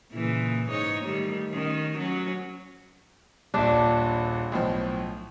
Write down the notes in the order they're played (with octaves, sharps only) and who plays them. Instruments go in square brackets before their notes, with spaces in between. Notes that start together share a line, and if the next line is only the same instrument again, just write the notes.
[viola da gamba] A#2 C#3 E3
G#2 D#4 C#5
D#3 G3 A3
D#3 C#4
F#3 C#4
[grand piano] D#1 A#1 [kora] D4 E5
[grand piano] B1 A2 F3